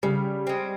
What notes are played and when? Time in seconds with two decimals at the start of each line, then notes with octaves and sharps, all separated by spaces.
0.03 C#3 G3
0.47 G#3 C4